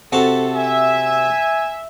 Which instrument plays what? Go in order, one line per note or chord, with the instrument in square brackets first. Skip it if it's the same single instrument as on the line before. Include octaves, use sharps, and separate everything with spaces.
[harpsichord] C3 F#4 A5 [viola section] A4
[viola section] E5 [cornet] G#5